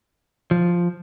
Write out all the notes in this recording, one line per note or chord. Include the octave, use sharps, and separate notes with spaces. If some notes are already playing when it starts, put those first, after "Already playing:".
F3